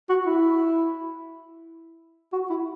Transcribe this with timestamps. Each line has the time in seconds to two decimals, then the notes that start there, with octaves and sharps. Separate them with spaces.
0.09 F#4
0.26 E4
2.33 F#4
2.50 E4